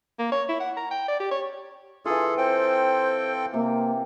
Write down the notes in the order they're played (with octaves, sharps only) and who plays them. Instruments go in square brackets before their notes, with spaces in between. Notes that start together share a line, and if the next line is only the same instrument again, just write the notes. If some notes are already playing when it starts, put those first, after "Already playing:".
[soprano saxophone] A#3
C#5
E4
F#5
A#5
G5
D5
G4
C#5
[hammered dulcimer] E3 F4 [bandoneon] G#4 A4
[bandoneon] C4 A4 G5 [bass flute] C5
[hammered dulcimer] C3 [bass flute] A#3